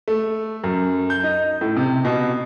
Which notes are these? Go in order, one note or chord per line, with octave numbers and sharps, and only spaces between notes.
A3
F#2
G6
D#4
A2
C3
B2